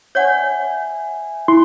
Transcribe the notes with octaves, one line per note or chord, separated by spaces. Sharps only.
C#5 D5 E5 F#5 G#5
E4 C6